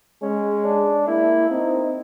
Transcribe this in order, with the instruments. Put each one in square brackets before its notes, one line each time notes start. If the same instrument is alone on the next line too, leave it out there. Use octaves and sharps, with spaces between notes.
[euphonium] G#3 [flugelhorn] C#4
[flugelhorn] D4
[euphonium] A#3 [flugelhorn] E4
[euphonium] C4 [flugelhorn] D#4